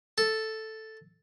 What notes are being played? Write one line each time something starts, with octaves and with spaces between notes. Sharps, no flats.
A4